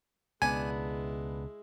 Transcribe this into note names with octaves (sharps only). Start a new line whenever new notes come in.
C#2 B2 G#3 B3 D4 E4 G#5